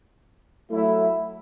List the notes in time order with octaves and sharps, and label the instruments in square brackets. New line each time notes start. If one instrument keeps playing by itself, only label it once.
[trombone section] F#3 A3 E4